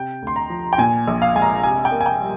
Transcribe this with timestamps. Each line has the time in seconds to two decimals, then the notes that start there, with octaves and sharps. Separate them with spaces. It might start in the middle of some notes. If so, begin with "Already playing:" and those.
Already playing: C3 G5
0.22 D2 C6
0.36 A#5
0.50 F3
0.73 G5
0.78 A#2 G#5
1.08 A#1
1.22 F5
1.35 G#3 G#5
1.42 A#5
1.63 C3 G#5
1.85 G5
1.91 A#3
2.01 G#5
2.06 G5
2.20 G3